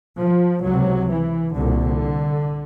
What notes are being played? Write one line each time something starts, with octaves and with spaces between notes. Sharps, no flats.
F3
C#2 C3 F#3
E3
C2 A#2 D3